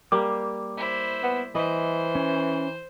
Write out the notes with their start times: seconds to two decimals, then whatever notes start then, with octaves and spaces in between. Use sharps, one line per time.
0.12 G3 A#3 G4 D6
0.77 E4 C5
1.23 B3
1.55 E3 C5 D#5
2.15 C#4